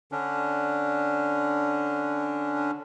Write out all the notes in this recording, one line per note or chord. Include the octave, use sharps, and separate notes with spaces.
D3 C#4 D4